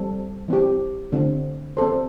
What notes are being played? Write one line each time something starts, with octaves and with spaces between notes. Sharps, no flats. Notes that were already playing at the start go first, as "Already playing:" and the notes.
Already playing: G3 C4 A4 C5
E3 C4 G4
D3 A3 C4
C4 A4 C5